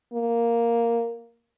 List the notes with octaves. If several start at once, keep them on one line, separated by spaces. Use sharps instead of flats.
A#3